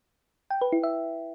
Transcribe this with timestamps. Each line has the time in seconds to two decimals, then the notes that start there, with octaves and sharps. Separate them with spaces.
0.50 G5
0.61 B4
0.72 E4
0.83 E5